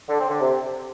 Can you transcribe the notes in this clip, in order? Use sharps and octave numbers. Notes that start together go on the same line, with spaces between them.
D3
C4
D3
C3